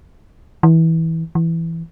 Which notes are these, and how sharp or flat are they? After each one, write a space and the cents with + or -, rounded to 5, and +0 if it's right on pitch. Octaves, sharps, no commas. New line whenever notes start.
E3 -20
E3 +5